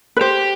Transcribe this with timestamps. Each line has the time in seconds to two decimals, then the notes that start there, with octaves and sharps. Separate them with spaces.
0.17 B4
0.21 G4 C5